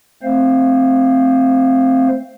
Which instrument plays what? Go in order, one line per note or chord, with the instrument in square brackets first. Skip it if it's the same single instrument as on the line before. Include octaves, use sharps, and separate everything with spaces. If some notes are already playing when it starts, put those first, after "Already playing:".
[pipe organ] A3 C4 C5 F5